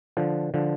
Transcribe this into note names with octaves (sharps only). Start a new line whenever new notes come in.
D3 F3
D3 F3